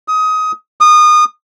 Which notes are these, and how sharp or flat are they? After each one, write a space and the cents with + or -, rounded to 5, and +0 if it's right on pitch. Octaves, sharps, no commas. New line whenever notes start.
D#6 +20
D#6 -25